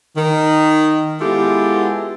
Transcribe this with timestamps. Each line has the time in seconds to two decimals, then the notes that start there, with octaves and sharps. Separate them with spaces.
0.17 D#3
1.20 G#3 B3 E4 F4 G4 A4